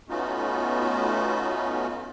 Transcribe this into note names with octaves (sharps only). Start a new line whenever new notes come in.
A3 B3 C#4 D#4 F4 F#4